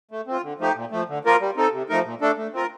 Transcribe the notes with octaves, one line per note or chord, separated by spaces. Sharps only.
A3
C4 F4
D3
F3 A3 D#4 G4
A#2
F3 A3
D3
F3 A#3 F4 A#4
G3
C4 D#4 A4
C3
F3 A3 D#4 A#4
A#2
A3 D4 A4
A3
C4 F4 A#4